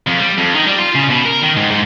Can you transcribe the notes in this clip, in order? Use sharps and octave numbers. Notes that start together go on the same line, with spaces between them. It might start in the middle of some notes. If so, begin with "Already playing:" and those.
F2
G3
F2
D#3
G3
F4
C#3
B2
A#4
D#3
G#2
G#2